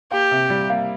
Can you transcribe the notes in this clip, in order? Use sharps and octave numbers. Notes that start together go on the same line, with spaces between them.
A#3 G4
C3
G3
A#3